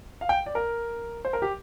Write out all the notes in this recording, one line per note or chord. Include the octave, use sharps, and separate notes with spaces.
F5
G5
D5
A#4
C5
A#4
G4